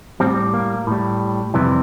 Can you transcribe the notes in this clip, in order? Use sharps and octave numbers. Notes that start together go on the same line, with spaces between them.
A2 G3 C4
A#3
A2 G3
F2 C3 E3 G3